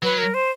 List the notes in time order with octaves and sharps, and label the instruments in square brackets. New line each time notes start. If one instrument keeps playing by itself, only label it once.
[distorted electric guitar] F#3 [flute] B4
[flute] A#4
C5